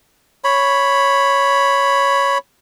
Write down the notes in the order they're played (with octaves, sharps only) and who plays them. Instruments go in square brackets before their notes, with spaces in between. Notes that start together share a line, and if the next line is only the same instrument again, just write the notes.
[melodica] C#5 B5